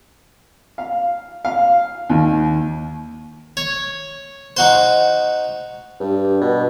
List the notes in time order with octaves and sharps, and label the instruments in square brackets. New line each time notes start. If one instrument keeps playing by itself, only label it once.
[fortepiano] F5
F5
D#2
[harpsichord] C#5
D#4 F#4 C5
[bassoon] G2
B2